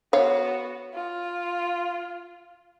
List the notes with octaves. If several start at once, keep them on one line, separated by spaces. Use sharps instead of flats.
B3 F#4 C#5 F5
F4